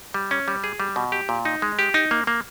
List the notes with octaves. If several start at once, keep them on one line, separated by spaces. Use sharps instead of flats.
G3
C#4
G3
G#4
G3
B2
G4
A#2
D#4
G#3
G4
D#4
A#3
A#3